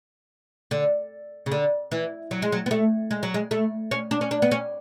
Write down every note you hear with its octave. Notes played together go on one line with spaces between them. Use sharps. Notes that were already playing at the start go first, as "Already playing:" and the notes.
D3
C#3
D3
E3
F#3
G#3
F#3
B3
A3
G#3
F#3
G#3
A3
C#4
D4
C#4
D4
B3
C#4